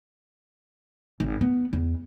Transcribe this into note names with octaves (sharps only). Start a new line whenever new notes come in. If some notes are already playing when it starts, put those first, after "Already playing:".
G#1
B3
E2